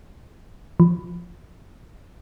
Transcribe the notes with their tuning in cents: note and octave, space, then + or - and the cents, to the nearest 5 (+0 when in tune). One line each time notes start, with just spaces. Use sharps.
F3 -10